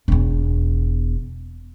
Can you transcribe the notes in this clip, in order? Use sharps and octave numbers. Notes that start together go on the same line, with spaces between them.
E1 E2